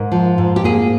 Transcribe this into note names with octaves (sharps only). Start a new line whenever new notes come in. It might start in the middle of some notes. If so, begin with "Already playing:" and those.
Already playing: G#2 A#4
F3
G#2
G4
A#3 G#4